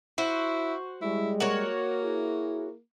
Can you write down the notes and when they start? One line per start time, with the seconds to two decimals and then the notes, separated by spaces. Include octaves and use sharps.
0.18 E4 F#4 C5
1.01 G3 G#3 E4
1.40 A#3 F#4 A#4 C#5
2.02 E4 G#4